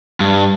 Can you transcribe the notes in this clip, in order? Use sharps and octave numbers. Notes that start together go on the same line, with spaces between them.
G2